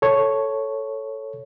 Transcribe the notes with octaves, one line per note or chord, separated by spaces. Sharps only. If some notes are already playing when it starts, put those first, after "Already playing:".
A4 C#5